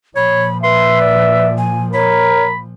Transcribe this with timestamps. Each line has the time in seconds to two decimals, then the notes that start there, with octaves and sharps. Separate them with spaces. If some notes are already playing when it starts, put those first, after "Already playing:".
0.16 A#2 F3 C#5 B5
0.63 B4 E5 C6
1.01 D5
1.58 G#5
1.93 A#4 C#5 B5